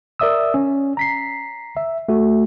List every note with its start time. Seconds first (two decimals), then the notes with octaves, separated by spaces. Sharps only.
0.20 A#4 D5 E5 D#6 E6
0.54 C#4
0.97 A#5 B6 C7
1.77 E5
2.09 A3 F#4